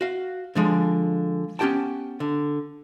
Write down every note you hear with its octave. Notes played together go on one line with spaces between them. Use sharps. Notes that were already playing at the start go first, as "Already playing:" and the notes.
F#4 F5
D3 F3 G#3
B3 C#4 F4 G4 G5 A5
D3